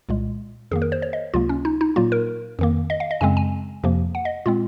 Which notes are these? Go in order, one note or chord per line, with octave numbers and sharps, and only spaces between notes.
C2 A#2 G#3
F2 D#3 A#3 G#4
A#4
C5
C#5
D#5
C#2 C3 F#3 A#3 F4
C#4
D#4
D#4
A#2 F#3 A#3 F4
A#4
F2 D#3 A#3
D#5
F5
D#5
F#2 C#3 G#3 C4 G#5
G#5
F2 C3 F3 A#3
F#5
D#5
A#2 G#3 C4 F4